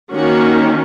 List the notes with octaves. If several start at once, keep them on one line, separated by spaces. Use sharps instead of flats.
D#3 A#3 C#4 F#4